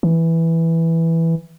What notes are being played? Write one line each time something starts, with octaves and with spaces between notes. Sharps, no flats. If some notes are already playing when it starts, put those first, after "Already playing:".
E3